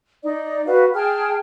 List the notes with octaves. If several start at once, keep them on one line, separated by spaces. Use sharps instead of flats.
D#4 D5
F#4 B4 F5
G#4 G5 A5 F6